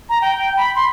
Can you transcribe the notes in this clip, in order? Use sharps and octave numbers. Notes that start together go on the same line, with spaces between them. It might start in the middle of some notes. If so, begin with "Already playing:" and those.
A#5
G5
B5
C6